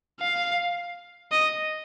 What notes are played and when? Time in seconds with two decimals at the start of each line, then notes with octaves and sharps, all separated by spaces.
0.20 F5
1.32 D#5